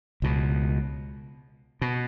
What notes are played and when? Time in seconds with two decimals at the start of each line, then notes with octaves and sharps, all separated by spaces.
0.22 C#2 B2
1.81 B2